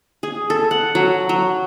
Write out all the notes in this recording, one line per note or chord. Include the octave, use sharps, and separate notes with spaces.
G#4
A4
F#5
F#3
F#3